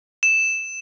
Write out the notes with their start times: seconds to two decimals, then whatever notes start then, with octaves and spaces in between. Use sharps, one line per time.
0.23 E7